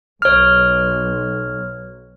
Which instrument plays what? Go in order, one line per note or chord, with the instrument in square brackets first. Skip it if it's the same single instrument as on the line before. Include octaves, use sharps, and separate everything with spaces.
[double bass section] B1 [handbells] C#5 F6